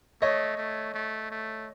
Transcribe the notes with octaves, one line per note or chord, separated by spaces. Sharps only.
A3 C#5 D#5
A3
A3
A3